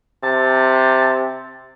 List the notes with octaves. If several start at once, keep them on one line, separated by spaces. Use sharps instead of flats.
C3 A5